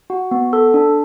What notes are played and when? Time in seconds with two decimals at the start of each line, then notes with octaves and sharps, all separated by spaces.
0.10 F#4 F#5
0.31 B3
0.53 A4
0.74 D4